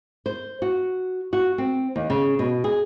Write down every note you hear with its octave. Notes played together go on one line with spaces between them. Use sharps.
C5
F#4
F#4
C4
D#2
C#3
B2
G#4